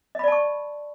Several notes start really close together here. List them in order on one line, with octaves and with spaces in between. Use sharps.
D#5 B5 D5 A5 C#6